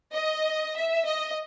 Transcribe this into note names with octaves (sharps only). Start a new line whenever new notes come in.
D#5
E5
D#5